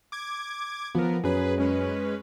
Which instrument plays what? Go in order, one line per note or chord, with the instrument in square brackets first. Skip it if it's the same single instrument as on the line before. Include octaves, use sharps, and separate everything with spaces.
[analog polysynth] D6 G#6
[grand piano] F3 [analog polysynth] B3 A#4
[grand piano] F#2 [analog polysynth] G#4 B4
[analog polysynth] G#3 C#4 B4